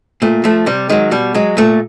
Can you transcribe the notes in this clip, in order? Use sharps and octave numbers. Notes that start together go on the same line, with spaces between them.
A#2 A3
F3 A3
C3 G3
D#3 F#3 G#3
B2 G3
F#3 G#3
A#2 A3